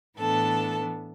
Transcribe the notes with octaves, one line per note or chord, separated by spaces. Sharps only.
A2 E3 B3 D4 A4 A5